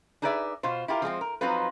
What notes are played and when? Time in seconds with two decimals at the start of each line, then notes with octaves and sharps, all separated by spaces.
0.22 D4 D#4 G#4 B4 D5 E5
0.63 B2 F4 C5
0.88 E4 F4 G4 A#4
1.02 F3 G#3 A3 C4
1.21 A#4
1.41 F3 F#3 C4 D#4 F4 B4